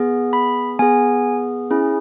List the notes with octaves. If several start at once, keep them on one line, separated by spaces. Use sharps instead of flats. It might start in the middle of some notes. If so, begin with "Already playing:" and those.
Already playing: B3 G#4
B5
B3 G#4 G#5
C#4 E4 G#4